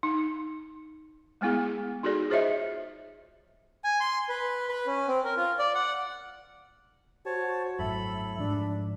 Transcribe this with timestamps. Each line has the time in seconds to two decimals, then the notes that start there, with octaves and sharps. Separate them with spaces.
0.03 D#4
1.41 G#3 A3 B3 E4 G#4
2.03 D#4 F#4 G#4 A4 D5
2.30 F4 G#4 C5 C#5 D#5 E5
3.84 G#5
4.00 C6
4.29 B4
4.69 B4
4.86 C#4
5.07 C4
5.24 A#4
5.37 F4
5.59 D5
5.75 F#5
7.26 F#4 C5 C#5 A5
7.79 G#1 F#2 A2 A4 E5 B5
8.38 G#2 F3 D4